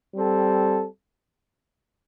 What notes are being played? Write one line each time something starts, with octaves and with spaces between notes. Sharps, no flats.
G3 C4 A4